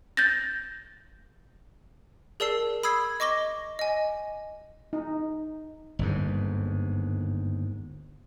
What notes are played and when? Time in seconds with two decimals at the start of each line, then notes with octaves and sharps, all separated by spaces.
0.17 G6 A6 A#6
2.40 G#4 A#4 D5 A5 E6 C7
2.83 B5 D#6 E6 G#6 C7
3.20 D#5 C#6 D6 A#6 G7
3.79 D#5 G#5
4.93 D#4
5.99 G1 D#2 G#2